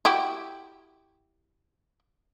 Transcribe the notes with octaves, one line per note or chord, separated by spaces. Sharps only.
E4 F#4 G4